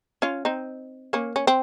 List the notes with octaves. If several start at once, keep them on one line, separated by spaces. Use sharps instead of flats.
C#4 F4
C4 D#4
A#3 C#4
C#4
C4